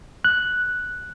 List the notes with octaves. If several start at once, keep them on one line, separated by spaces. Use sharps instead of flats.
F#6